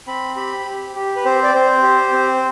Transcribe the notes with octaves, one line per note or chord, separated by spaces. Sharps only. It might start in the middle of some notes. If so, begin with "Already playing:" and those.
C4 B5
G4 B5
G4
G4
B4
C4 C5
D5
C4 C5
G4
C4